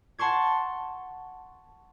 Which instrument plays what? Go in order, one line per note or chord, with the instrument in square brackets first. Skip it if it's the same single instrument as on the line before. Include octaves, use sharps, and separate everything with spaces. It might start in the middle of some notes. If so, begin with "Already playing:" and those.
[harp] F#5 A5 C6 C#6 G#6